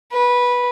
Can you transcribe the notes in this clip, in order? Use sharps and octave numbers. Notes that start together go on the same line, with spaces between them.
B4